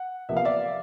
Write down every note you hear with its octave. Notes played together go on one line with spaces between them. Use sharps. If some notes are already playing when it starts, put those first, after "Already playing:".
Already playing: F#5
E2 C3 F3 A#3 E5
F5
D5 E5